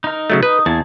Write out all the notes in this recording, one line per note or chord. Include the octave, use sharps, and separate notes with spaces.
D#4 A#4
C#3 F#3 A3
D#4 B4
E2 A#3 G#4 A5